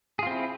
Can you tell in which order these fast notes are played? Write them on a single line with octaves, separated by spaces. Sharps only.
G#4 F4 C4 E4